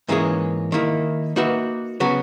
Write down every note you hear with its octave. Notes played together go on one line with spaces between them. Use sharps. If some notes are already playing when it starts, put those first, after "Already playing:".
G#2 E3 A#3 C#4 G#4
D#3 A#3 E4
A#3 D#4 F#4 B4 E5
C#3 F#3 B3 F#4